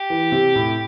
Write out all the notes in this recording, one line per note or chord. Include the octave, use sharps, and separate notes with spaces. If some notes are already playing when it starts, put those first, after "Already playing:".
Already playing: G4
E3
C3
A2